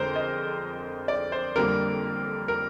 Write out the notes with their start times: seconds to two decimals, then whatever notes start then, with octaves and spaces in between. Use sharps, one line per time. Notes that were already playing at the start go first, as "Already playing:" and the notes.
Already playing: F2 D3 G#3 A#4 C5
0.16 D#5
1.08 D5
1.32 C5
1.55 F2 D3 G3 A#3 A#4
2.48 A#4